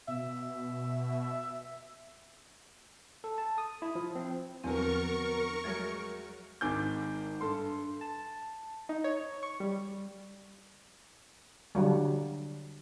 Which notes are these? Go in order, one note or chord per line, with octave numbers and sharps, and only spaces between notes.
B2 E5
A4
A5
D#6
E4
F3
C4
E2 D3 F3 F#3 B3 C4 A#4 C#6
F#3 G#3 A3 G#6 A6
G#1 G#2 G#5 D6 G6
G2 A4 C6
A5
D#4
C#5
C#6
G3
D3 F#3 G3